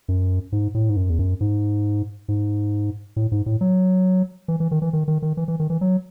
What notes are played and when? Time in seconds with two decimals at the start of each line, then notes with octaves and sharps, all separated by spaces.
0.08 F#2
0.52 G#2
0.74 A2
0.89 G#2
0.96 F#2
1.10 E2
1.19 F#2
1.41 G#2
2.28 G#2
3.16 A2
3.32 G#2
3.46 A2
3.61 F#3
4.48 E3
4.60 E3
4.71 D#3
4.82 E3
4.93 D#3
5.08 D#3
5.22 D#3
5.37 E3
5.48 E3
5.60 D#3
5.70 E3
5.81 F#3